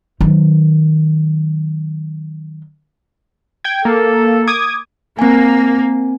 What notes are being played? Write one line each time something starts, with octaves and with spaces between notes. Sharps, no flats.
D#3 F#3
G5 G#6
A#3 A4
D6 D#6 G#6
A#3 C4 G#5